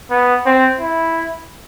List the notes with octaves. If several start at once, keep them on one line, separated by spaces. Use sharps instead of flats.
B3
C4
E4